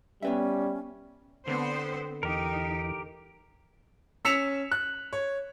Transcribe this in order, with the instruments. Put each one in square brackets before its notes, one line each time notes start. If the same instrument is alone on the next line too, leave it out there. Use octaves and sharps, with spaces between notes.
[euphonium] G3 [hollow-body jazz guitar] B3 B4 E5 [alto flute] C#4
[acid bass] D3 [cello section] B3 C4 C5
[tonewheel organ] E2 E3 [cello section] D#4 [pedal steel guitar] G4 A#4
[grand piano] C#4 E6 B6 C#7 E7 F7
F#6
C#5